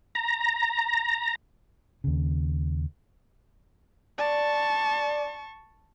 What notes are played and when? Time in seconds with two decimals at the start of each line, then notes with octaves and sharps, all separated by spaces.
0.15 A#5
2.04 D#2 C#3
4.18 D5 A5 C#6